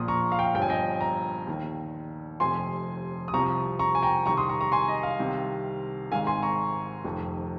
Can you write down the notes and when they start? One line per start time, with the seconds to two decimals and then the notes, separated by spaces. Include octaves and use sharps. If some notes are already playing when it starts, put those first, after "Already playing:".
Already playing: A#1 A#2 F3 D#6
0.08 A#5 C#6
0.32 F5
0.39 G5
0.46 F5
0.54 G1 G2 F3 G5
0.62 G#5
0.70 D#5 G5
1.01 G5 A#5
1.47 D#2 D#3
2.40 F1 F2 C3 G#5 C6
3.28 D#6
3.34 C2 C3 F3 A#5 C#6
3.79 A#5 C#6
3.95 G#5
4.03 G5 A#5
4.26 C2 C3 D#3 A#5 C#6
4.37 C6 D#6
4.49 A#5 C#6
4.61 A#5 C#6
4.72 G#5 C6
4.88 D#5
5.03 F5
5.19 C2 C3 D#3
6.12 G#1 G#2 D#3 F5 G#5
6.27 G#5 C6
6.42 A#5 C#6
7.04 F1 F2 D#3